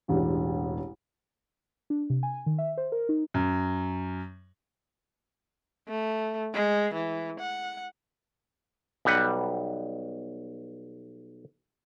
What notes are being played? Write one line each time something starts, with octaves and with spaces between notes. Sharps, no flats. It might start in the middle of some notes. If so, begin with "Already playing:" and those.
E1 A1 D4 G4
D4
C3
G#5
D#3
E5
C5
A#4
D#4
F#2
A3
G#3
E3
F#5
B1 G3 B4 F#5